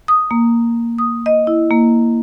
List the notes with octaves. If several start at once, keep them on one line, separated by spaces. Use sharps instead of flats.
D#6
A#3
D#6
D#5
E4
A#3